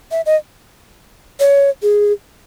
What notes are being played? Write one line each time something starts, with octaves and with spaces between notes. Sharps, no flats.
E5
D#5
C#5
G#4